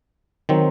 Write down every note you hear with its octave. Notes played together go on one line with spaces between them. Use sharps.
D#3 F#3 C4